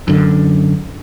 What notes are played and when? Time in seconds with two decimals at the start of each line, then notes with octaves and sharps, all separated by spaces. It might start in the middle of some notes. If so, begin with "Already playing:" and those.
0.08 F#2 D3